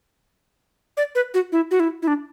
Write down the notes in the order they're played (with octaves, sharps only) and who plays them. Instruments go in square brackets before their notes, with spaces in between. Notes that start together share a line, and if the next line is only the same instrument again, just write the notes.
[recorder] D5
B4
F#4
E4
F#4
E4
E4
D4